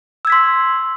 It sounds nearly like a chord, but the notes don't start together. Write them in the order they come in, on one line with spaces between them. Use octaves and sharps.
E6 G#6 B6 C6